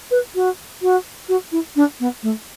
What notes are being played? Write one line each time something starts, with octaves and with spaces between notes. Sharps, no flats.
B4
F#4
F#4
F#4
E4
D4
B3
A3